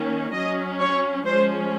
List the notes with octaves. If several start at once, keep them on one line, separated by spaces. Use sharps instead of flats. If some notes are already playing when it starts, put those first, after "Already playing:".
Already playing: D#3 A#3 C#4
F#3 C#4 D#5
C#5
F3 G#3 C#4 C5